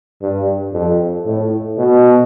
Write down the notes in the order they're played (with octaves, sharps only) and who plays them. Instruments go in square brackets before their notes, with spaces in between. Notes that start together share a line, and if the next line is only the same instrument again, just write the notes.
[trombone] G2
F2
A2
B2